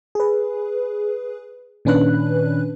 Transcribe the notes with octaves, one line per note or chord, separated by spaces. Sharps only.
G#4 B4
A#2 D#3 C#4 D4 B4 F#6